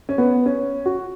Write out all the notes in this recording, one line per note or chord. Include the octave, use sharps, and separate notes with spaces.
C#4
B3
C#4
F#4